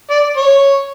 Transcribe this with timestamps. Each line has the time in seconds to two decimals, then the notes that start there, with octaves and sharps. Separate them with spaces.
0.10 D5
0.37 C#5